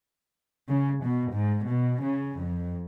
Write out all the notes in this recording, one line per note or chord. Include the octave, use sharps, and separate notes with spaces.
C#3
B2
G#2
B2
C#3
F2